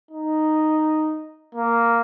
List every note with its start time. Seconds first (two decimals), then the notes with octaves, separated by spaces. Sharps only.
0.11 D#4
1.55 A#3